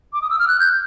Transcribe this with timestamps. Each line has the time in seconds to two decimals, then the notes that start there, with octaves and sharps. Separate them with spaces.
0.13 D6
0.22 D#6
0.30 E6
0.39 F6
0.48 F#6
0.60 G6